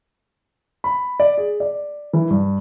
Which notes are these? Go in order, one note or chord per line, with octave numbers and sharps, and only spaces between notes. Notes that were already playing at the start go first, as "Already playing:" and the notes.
B5
D5
G#4
D5
E3
G2